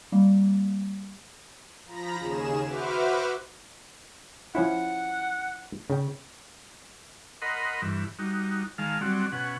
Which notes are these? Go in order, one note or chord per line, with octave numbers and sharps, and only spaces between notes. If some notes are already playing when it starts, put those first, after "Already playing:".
G3 A#3
F3 A#5 B5 A#6
D#2 C#3 G#4 E7
F#4 B4 C5 E5 D6 F6
F3 C#4 E4 F#5
C#3 G5
A#4 D#5 F#5 B5 C6
G2 E3
G3 D#4 F#4
D#3 G#3 F5 A5 F6
F#3 G3 C4 F#4 D5
B2 C#4 F#5